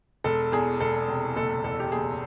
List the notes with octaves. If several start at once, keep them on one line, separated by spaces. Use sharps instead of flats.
E1 A4
E2 G#4
E1 A4
C3
F#1 A4
E2 A4
G4
F#1 G#4